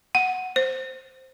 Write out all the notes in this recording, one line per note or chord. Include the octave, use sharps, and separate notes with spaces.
F#5
C5